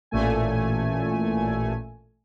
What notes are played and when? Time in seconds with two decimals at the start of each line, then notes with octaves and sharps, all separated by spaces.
0.11 A1 A#2 A3 G#5